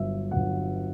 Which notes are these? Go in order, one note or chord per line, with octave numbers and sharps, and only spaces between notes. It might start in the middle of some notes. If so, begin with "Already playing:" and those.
Already playing: G1 G2 F#3 E5
G1 G2 F#3 F#5